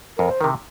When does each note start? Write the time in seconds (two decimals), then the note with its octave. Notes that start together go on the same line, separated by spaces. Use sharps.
0.18 F2 A#4
0.30 C5
0.41 C3 D#3 A#4